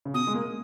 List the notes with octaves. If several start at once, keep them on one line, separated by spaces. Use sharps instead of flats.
C#3
B2 D#6
G#3
A#3